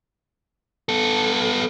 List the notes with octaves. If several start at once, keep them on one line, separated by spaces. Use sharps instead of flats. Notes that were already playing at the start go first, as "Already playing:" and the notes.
B3 A4